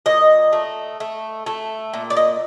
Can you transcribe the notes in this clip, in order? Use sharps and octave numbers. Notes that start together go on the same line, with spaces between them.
A#2 D#5
A3
A3
A3
A#2
D5
D#5